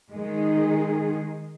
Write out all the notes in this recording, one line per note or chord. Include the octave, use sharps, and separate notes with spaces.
D#3 G#3 D#4 G#4